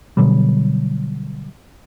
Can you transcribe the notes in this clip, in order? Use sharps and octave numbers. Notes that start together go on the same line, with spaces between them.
B2 D3 F#3 G3